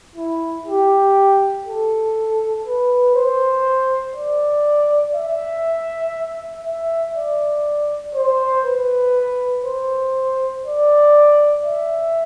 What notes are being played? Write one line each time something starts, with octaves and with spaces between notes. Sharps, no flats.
E4
G4
A4
B4
C5
D5
E5
E5
D5
C5
B4
C5
D5
E5